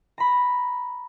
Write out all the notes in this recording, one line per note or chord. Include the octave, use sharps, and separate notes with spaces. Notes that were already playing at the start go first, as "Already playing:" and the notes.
A#5 B5